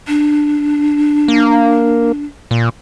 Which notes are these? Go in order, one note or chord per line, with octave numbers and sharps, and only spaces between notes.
D4
A#3
A#2